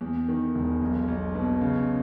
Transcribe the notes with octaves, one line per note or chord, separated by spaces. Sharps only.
E2
D#3
E1
B1
B1
B2
C#3